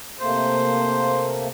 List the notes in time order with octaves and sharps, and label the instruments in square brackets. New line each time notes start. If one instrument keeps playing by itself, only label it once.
[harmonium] C3 A3 A#3 [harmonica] C5